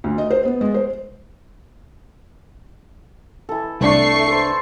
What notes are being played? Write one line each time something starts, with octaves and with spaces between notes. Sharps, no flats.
D2
D#5
C5
B3
G#3
C5
E3 A4
C2 A3 D4 C#6 C7
A4 B4 C5